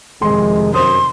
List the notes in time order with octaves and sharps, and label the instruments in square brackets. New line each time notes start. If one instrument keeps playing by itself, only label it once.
[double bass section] F2 C3 D#3 [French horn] G#3 [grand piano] C6
[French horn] F#2 [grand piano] C5 D#6 [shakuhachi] C6